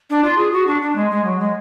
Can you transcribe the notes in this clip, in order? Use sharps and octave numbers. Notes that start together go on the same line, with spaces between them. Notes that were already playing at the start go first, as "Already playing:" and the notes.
D4
F4
G#4
F#4
D4
D4
G#3
G#3
F#3
G#3